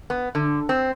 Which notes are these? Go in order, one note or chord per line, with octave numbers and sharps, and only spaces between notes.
B3
D3
C4